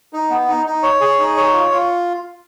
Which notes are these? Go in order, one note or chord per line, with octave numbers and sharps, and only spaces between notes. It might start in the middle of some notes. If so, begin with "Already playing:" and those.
D#4
B3
D#4
D#4
C#5
G#4
D#4
C#5
F4
F4